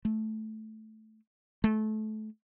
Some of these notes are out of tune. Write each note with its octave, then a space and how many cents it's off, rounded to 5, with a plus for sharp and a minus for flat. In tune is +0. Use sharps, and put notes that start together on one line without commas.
A3 -10
A3 -25